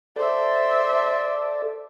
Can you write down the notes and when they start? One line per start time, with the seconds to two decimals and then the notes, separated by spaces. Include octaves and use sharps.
0.16 A4 C5 D5 E5